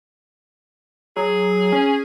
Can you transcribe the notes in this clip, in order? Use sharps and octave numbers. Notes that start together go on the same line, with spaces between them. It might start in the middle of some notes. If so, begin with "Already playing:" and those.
F#3 G#4
C#4